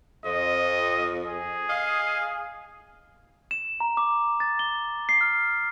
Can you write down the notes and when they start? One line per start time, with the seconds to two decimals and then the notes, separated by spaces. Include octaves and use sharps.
0.25 F2 D#5
1.26 G#4
1.70 D#5 F5
3.51 E7
3.80 A#5
3.97 D6
4.40 A6
4.59 G7
5.09 C7
5.21 F6